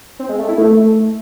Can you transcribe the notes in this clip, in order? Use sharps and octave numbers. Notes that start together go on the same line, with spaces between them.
C4
G#3
A3
E4
A3